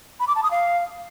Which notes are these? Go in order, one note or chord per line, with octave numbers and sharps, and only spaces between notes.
B5
D6
A5
D#6
F5